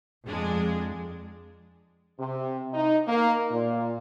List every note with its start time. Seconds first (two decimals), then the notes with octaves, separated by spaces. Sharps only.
0.25 F2 G#3 D4
2.19 C3
2.73 D#4
3.08 A#3
3.51 A#2